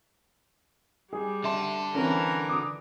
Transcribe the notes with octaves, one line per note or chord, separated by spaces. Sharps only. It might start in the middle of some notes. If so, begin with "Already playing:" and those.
G3 G#4
D3 E5 A5 C6
E3 C4 C#4 A#4
D6 D#6